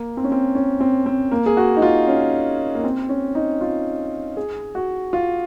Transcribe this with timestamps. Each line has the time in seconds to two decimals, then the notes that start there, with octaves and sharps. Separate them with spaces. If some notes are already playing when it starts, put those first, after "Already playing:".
Already playing: A#3
0.17 C4
0.24 C#4
0.32 C4
0.55 C#4
0.81 C4
1.06 C4
1.31 A#3
1.46 G#4
1.57 F#4
1.77 D#4
1.82 F4
2.08 C#4
2.75 A#3
2.84 C4
3.09 C#4
3.35 D#4
3.61 F4
4.37 G#4
4.75 F#4
5.13 F4